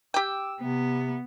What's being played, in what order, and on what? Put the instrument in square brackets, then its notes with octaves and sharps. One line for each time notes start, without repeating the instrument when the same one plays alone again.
[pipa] G4 G5 [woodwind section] D6 E6
[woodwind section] C3 [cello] B3